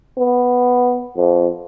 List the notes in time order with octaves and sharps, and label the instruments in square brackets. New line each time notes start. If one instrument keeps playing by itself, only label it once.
[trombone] B3
F2